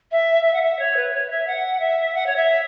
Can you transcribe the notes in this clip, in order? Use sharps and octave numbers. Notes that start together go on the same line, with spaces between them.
E5
E5
F#5
E5
C#5
B4
C#5
E5
F#5
E5
F#5
C#5
E5